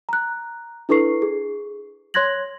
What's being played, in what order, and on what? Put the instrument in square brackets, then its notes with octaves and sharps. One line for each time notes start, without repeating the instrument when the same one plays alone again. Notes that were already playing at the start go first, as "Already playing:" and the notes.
[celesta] A#5 F#6
D4 E4 A4 B4 C#6 C7
G#4
C#5 C6 F#6 G#6 A#6 F#7